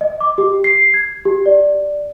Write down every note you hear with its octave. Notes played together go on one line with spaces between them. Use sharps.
D#5
D6
G4
C7
G#6
G4
D5